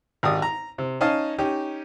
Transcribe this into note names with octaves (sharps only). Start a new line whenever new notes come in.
G#1 G4 D5 D#6
A#5
C3
C#4 D#4 D#5 F5 A5
C#4 D#4 G4